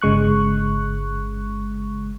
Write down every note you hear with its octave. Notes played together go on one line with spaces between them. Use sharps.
G1 C#3 G#3 C#6 F#6